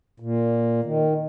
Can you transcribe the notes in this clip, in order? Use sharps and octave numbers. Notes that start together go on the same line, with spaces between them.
A#2
D#3